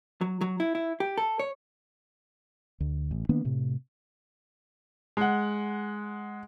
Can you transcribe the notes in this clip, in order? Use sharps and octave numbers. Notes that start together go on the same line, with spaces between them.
F#3
F#3
E4
E4
G4
A4
C#5
D2
A1
D#3 A#3 B3 D4
A2 C3
G#3 F#5